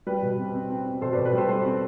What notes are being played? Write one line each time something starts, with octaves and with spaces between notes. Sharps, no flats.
G3 B4
B2
C4
C4
C4
C4
B2 A4 C5
B4 D5
B2
B4
G3 A4 C5
G3 A4 C5
C4